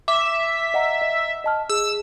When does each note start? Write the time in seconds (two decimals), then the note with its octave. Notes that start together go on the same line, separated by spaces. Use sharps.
0.08 E5 D6
0.74 D#5 F#5 A#5
1.01 D#5
1.44 D#5 A5 F6
1.69 G#4 E6